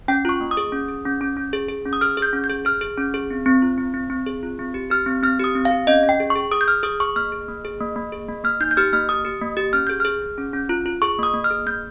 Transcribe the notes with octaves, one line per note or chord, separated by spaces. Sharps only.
C#4 G5
F4 C#6
A#3
D#6
G#4
C#4
G#4
C#4
C#4
C#4
G#4
G#4
C#4
D#6
G#4 F6
G#4
G6
C#4
G6
G#4
G#4 F6
G#4
C#4
G#4
C4
C4
F4
C4
C4
C4
G#4
F4
C4
G4
G4 F6
C4
C4 F6
G4 D#6
C4
F5
G4
C#4 D#5
C#4
G5
G#4
C#6
G#4
G#4 D#6
G6
G#4 F6
G#4 D#6
G#4 C#6
A#3 F6
G#4
A#3
G#4
A#3
A#3
G#4
A#3
A#3 F6
D#4 G6
G6
G4 F6
A#3 F6
G4 D#6
G4
A#3
G4
C#4 F6
G#4 G6
G#4 F6
G#4
C#4
C#4
F4
F4
G#4 C#6
A#3 D#6
A#3
F6
G#4
A#3 G6